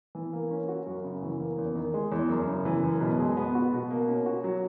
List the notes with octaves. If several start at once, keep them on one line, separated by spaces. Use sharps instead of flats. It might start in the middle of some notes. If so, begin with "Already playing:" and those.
E3
A#3
C#4
F#4
F#2
C#3
E3
A#3
E2
D#3
G#3
E2
F#2
C#3
E3
F#2
B2
G#3
B3
F#4
B2
A#3
C#4
F#4
F#3